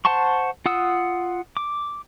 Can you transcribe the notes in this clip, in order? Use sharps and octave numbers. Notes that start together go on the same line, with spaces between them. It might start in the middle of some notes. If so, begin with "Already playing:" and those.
C5 F#5 A5 C6 C#6
F4 F#5 D#6 E6
D6